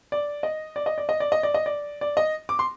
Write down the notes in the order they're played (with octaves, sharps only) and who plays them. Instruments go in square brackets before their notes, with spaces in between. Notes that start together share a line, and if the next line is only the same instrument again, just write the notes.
[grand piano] D5
D#5
D5
D#5
D5
D#5
D5
D#5
D5
D#5
D5
D5
D#5
D6
C6